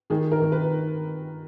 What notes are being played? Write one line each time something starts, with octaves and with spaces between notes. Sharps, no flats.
D#3 G#4
A#4
D#3
B4